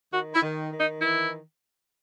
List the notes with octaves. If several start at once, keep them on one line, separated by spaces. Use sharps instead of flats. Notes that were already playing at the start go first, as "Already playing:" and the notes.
D#3 F#4
E4
D#3
D#3
D#4
E3 E4